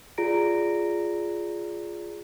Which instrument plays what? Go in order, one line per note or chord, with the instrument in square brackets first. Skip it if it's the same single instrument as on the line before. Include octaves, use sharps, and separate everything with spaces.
[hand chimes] F4 G#4 D5 A#5 A#6 D7